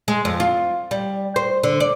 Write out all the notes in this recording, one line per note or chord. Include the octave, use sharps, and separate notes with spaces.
G#3
F2
F4
G3
C5
D3
D5